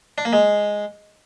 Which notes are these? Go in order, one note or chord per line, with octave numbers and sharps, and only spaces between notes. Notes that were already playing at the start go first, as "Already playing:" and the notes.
D4
A#3
G#3